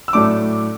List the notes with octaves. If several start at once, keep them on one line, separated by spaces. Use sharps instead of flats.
E6
A2 F#3 A3 D4 D6